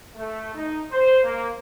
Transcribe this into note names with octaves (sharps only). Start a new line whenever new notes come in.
A3
D#4
C5
A#3